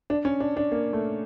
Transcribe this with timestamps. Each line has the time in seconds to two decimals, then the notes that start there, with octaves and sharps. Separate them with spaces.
0.10 D4
0.25 C#4
0.40 D4
0.57 D4
0.72 A#3
0.93 A3